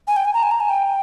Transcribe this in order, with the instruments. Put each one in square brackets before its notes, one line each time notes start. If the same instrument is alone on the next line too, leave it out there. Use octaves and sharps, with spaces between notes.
[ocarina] G#5
G5
G#5
A#5
G#5
A#5
G#5
G5